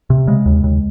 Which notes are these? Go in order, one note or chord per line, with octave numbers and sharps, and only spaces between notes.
C3
C#3 G#3
D#2
D#2